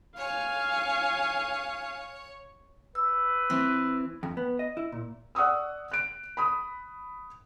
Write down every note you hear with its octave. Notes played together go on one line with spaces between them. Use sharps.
C#5 F5 G#5
B4 E6
E3 C4
F2
B3
D#5
E4
A#2
D5 F#5 C#6 D#6 E6
F#6 D7
B5 D#6